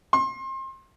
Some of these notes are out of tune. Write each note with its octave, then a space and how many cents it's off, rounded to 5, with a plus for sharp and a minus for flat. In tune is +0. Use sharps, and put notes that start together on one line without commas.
C6 +30